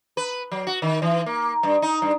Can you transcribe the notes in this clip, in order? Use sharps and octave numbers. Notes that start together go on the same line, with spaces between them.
B4
F#3
F#4
D#3
E3
A#3
G2
D#4
G2